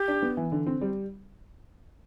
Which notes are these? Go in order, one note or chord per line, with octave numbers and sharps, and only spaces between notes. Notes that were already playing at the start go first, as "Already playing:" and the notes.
Already playing: G4
D4
B3
E3
D3
C4
G3